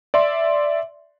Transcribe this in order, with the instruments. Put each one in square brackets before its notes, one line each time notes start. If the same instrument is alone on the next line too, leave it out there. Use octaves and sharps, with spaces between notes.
[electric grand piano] D5 E5 C6